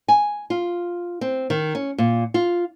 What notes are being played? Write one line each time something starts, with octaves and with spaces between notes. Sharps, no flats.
G#5
F4
C4
D#3
C#4
A#2
F4